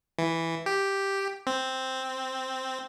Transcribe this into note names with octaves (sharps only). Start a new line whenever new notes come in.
E3
G4
C4